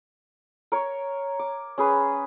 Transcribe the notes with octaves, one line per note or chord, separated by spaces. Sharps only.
A#4 C#5
D6
C#4 G#4 B4